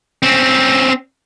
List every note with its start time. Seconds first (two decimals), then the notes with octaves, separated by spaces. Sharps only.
0.23 C4 C#4